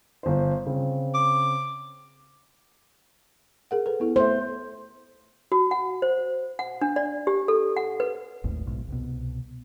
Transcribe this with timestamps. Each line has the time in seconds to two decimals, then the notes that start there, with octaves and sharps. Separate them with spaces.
0.23 G1 C5
0.66 C#3 C4
1.14 D6
3.71 G#4 A#4 F#5
3.86 A4 B4
4.00 B3 E4 A4
4.16 A3 A4 C5 E5
5.52 F#4
5.71 F#5
6.02 C5
6.59 F#5
6.81 D4
6.96 D5
7.27 G4
7.48 A4
7.77 F#5
8.00 B4
8.44 G#1 D#2 A2
8.66 B1 G#2 B2
8.88 C2 B2